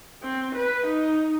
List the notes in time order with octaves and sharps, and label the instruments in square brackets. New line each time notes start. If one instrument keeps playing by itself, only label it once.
[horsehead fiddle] C4
B4
D#4